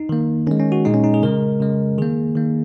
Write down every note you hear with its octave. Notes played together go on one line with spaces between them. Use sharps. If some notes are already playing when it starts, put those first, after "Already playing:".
Already playing: D#4
D#3 A#3
D#3 G#3 C#4
C#4
F#4
A#2 G#3 D#4
C#4
D#4
G#4
C#3 G#3 A#4
C#3 G#3
D#3 A#3 G#4
D#3 A#3